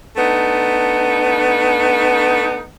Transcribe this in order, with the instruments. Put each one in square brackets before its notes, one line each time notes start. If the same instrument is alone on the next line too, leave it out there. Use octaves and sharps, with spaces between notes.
[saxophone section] A3 B3 D4 D#4